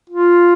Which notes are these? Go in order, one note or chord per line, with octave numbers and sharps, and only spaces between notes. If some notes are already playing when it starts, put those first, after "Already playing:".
F4